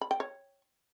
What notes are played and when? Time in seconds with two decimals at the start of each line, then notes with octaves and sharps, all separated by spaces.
0.01 B5
0.11 G5
0.20 C#5